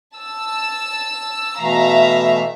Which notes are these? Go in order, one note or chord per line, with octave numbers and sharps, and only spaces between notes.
A5 E6
B2 E3 A3 E5 F5 A#5